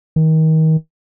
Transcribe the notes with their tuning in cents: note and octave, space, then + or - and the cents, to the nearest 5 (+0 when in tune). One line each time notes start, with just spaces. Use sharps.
D#3 +30